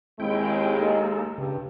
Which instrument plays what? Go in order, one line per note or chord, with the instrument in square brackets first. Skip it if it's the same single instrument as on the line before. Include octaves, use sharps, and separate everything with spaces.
[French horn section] D#2 G#3 [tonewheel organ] C4 E4 G5
[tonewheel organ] A#3 D#4 A4
[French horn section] G2 [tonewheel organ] C#3